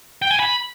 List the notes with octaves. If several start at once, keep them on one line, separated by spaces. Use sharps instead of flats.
G5
G#5
B5